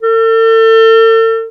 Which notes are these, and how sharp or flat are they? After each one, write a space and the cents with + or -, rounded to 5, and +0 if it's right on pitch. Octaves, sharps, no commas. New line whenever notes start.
A4 +40